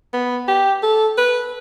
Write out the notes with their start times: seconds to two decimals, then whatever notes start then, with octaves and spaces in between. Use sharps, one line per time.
0.13 B3
0.48 G4
0.83 A4
1.18 B4